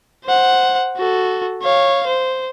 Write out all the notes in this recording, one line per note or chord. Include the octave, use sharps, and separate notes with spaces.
C5 F#5
F#4 A4
C#5 F5
C5